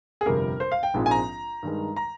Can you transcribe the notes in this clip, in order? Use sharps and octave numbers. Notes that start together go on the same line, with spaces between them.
G#4
G1 F2 C3 G3 A#4
C5
F5
G5
A#1 G#2 F3 G#3 C4
G#5
A#5
G2 D#3 G#3
A#5